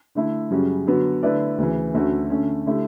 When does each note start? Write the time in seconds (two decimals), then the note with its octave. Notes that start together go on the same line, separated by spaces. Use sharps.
0.15 D3 A3 E4
0.50 F#2 C#3 G3 C#4 F#4
0.87 D3 F#3 B3 F#4
1.23 D3 A3 E4 B4 D5
1.58 D2 C#3 E3
1.94 D2 D3 A3 C#4 F#4
2.30 D3 A3 C#4
2.66 D3 A3 E4 G4